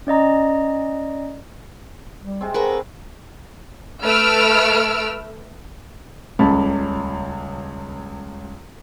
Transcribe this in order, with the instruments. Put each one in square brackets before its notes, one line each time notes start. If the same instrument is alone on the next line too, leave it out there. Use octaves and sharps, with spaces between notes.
[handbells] C#4 D5 D#5 A#5
[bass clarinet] G3
[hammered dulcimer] C3 G#3 C4
[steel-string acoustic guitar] F#4 A#4 B4 [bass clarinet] G#4
[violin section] A3 B4 E6 F6 D7
[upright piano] D#1 C#2 C#3 A5 B5